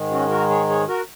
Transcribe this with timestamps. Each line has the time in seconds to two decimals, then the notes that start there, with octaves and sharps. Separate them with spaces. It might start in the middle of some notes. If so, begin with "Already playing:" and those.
Already playing: G#2 D#3 G#3
0.11 C#4 F#4
0.30 F#4 A#4
0.49 G#4 C#5
0.69 G#4 C#5
0.88 F#4 A#4